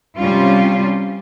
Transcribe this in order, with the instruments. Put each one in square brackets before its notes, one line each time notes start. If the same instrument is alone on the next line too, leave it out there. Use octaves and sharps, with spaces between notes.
[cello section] C3 G3 C#4 F4